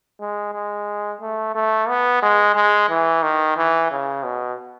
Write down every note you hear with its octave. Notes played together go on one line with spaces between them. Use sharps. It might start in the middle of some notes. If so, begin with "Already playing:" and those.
G#3
G#3
A3
A3
B3
G#3
G#3
E3
D#3
E3
C#3
B2